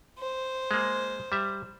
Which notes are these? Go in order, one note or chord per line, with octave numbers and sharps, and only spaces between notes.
C5
G#3 A#3
G3 E5